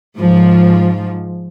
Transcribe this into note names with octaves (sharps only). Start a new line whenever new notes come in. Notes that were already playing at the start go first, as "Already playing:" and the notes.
G#2 F3